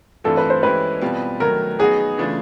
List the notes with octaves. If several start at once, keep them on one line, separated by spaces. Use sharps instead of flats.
G2 E3 A3 C4 F4 A4
B4
C5
E3 G#3 C#4 E4 G4 B4
B2 G3 C4 F4
D#3 F#3 A3 A#4
F#3 B3 D#4 F#4 G#4
C#3 E3 A3 D4 F4